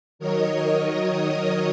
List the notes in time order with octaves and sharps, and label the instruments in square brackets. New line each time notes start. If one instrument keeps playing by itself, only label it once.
[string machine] D#3 F#3 A#4 C#5 D#5 D#6